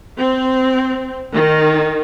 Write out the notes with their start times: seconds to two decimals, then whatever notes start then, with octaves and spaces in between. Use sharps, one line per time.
0.17 C4
1.34 D#3